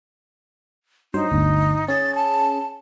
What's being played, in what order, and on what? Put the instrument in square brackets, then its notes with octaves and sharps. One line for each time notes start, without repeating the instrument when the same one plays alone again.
[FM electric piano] G2 F#3 C5 [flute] D#4
[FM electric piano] G1 D2
[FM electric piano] C#4 G#4 [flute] A6
[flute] A5